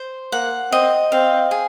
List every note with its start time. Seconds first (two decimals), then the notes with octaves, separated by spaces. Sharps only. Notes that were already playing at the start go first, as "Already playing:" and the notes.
Already playing: C5
0.32 A#3 F#5
0.72 C4 D#5
1.12 C4 F5
1.51 G#4